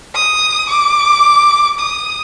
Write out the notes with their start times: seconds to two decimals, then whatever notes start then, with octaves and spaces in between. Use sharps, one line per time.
0.15 D#6
0.70 D6
1.79 D#6